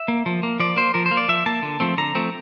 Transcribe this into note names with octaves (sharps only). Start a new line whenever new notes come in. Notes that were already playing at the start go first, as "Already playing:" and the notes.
Already playing: E5
A#3
F3
A#3
F3 D5
A#3 C5
F3 A#4
C5
A#3
D5
F3 E5
A#3 A5
D3
F3 A3 C4
D3 A#5
F3 A3 C4